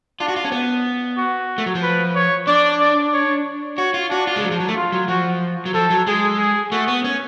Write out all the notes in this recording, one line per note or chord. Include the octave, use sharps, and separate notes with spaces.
D4 F4
F#4
F4
C#4
B3
F#4
A3
F#3
F3
B4
C#5
D4 D5
D5
C#5
F#4 C#5
F4
D4 F#4
F4
G#3
F#3
F3
F#3
A3
F4
F#3
F3 F#4
F#3
F3 A4
F#3
G#3 G#4
G#4
A3 F#4
B3
C#4